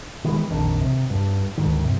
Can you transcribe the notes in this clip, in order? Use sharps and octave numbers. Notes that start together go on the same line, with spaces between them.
D#3 E3 G#3 B3
A#1 F2 D#3 D4
C3
G2
D2 G#2 D#3
G2 C3